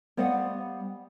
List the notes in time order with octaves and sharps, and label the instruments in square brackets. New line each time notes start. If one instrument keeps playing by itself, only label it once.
[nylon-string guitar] G3 B3 C5 D#5 F5 F#5